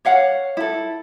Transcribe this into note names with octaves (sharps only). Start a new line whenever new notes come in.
C#5 F5 F#5
E4 A4